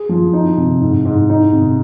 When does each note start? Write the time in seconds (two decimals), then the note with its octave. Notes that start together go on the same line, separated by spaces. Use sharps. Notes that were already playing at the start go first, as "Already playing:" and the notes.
Already playing: G#4
0.09 F3
0.33 D#4
0.57 C3
0.81 G#2
1.05 G#2
1.29 D#4
1.53 C3